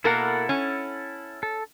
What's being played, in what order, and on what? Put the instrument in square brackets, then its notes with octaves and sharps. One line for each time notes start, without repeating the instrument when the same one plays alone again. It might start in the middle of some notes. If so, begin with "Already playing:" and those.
[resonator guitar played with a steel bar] B2 A#3 A#4 [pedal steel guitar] E4 A4 F#5
[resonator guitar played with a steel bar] C#4
[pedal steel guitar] A4